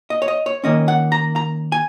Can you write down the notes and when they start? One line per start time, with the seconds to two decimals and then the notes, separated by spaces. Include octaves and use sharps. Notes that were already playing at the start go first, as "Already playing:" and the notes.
0.10 D#5
0.22 C#5
0.28 D#5
0.46 C#5
0.64 D#3 A#3 C#4 D#5
0.88 F#5
1.12 A#5
1.36 A#5
1.72 G#5